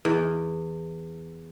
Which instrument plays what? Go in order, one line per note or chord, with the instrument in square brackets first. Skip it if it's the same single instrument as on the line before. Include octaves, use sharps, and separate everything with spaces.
[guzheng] E2